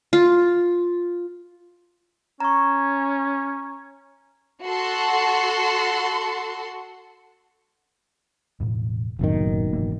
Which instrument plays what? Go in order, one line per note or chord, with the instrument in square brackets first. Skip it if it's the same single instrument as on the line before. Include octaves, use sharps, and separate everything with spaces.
[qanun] F4
[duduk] C#4 [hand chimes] A#5 C#6
[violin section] F#4 A4 F#5 C6
[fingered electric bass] E1 A2
[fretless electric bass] F#1 B1 D#3 [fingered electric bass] F#2 A2 C3
[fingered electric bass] G#2 E3 A#3